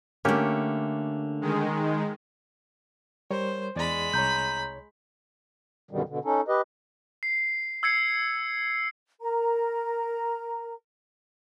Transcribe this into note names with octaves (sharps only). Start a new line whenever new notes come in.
D3 A3 A#3 C#4 G4
D#3 G#3
G3 A#4 C5 C#5
E2 G#3 D5 B5 A6
C2 C#5 A#5 G6
F#2 B2 D3 D#3 G3
B2 D3
C#4 D#4 A4
G4 B4 D#5
C7
E6 G#6 C7 C#7
A#4 A#5